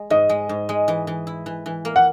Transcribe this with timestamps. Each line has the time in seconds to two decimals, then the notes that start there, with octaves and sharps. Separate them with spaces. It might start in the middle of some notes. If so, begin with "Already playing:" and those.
Already playing: G#3
0.10 G#2 D#5
0.29 G#3
0.49 G#2
0.69 G#3
0.88 E3
1.07 E3
1.27 E4
1.46 E3
1.66 E3
1.85 A#3
1.96 F#5